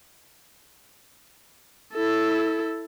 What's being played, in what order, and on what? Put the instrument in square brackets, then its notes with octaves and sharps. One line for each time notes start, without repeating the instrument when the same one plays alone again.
[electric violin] E4 A4